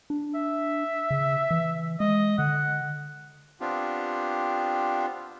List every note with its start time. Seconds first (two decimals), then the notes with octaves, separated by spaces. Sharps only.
0.10 D4
0.35 E5
1.11 C#3
1.51 E3
2.00 G#3 D#5
2.39 D3 F#5
3.61 B3 C4 D4 F4 G4